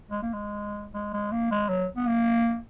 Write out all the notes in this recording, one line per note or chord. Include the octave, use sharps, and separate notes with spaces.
G#3
A#3
G#3
G#3
G#3
A#3
G#3
F#3
B3
A#3